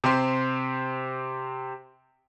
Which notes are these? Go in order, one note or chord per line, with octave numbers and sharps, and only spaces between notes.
C3 C4 C6